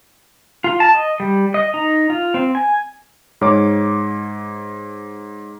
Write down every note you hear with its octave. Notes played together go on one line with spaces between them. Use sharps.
F4
A5
D#5
G3
D#5
D#4
F4
C4
G#5
G#2 C#5 D6